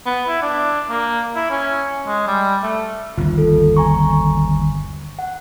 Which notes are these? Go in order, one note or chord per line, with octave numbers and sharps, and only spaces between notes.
B3
E4
D4
A#3
E4
C#4
G#3
G3
A3
G1 D#2 F4
A4
G#5 A#5 C#6
F#5